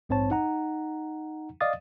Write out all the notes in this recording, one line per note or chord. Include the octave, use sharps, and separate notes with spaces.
A#1 G#2 C4 C5 C#5 A5
D#4 F#5 A#5
D5 D#5 F5 D#6 A6